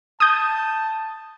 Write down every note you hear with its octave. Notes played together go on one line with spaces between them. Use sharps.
A5 D#6 G6